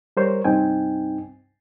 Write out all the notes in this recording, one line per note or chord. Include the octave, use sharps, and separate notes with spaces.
G3 A#4 C5 C#5
C2 G2 C4 D#4 G5 G#5